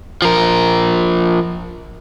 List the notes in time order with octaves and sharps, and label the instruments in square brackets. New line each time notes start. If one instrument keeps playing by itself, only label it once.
[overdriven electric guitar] F3 A#4